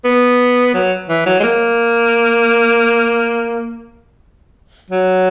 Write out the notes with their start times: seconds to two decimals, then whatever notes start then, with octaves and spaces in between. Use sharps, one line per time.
0.05 B3
0.74 F#3
1.09 E3
1.26 F#3
1.40 G#3
1.43 A#3
4.90 F#3